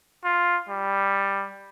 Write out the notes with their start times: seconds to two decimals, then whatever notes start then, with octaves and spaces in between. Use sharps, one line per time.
0.24 F4
0.69 G3